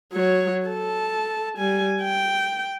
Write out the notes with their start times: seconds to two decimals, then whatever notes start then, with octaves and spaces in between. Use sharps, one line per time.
0.13 F#3 C#5
0.66 A4 A5
1.58 G3 G#5
2.01 G5